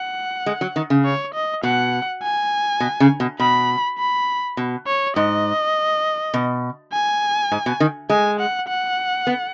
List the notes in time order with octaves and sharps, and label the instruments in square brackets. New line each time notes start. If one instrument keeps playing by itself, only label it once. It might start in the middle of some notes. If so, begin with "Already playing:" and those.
Already playing: [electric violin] F#5
[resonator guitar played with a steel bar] G#3
F#3
D#3
C#3
[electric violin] C#5
D#5
[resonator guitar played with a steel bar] B2 [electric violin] F#5
[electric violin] G#5
[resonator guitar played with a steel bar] B2
C#3
B2
[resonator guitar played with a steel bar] B2 [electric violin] B5
[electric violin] B5
[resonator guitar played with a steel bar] B2
[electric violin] C#5
[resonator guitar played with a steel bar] G#2 [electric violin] D#5
[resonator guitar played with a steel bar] B2
[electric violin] G#5
[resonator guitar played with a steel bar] G#2
B2
D#3
[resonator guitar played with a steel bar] G#3 [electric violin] G#5
[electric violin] F#5
F#5
[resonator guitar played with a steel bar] B3